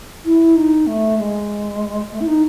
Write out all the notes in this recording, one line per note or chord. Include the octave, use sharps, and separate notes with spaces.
E4
D#4
A3
G#3
A3
E4
D#4